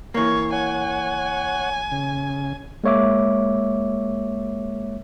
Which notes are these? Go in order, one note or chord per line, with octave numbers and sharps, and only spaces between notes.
E3 A#3 C#5
C#5 F#5 G#5
C#3
G#3 A#3 C#5 E5 D6